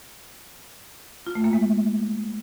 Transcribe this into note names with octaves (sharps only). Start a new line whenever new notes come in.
F4
A3
A#3
G#3